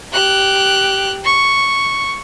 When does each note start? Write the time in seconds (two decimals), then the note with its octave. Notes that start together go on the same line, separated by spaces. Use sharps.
0.13 G4 F#6
1.25 C#6